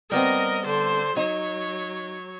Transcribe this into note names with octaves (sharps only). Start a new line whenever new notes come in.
G3 B3 C4 A#4 D#5
D3 C5
F#3 D#4 C#5